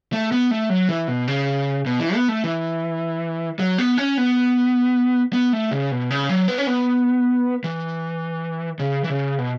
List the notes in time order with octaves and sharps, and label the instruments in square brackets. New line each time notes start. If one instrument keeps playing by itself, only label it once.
[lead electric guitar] A3
B3
A3
F#3
E3
B2
C#3
B2
E3
B3
A3
E3
F#3
B3
C#4
B3
B3
A3
C#3
B2
C#3
F#3
B3
C#4
B3
E3
C#3
E3
C#3
B2